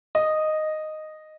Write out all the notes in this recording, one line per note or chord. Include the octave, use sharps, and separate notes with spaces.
D#5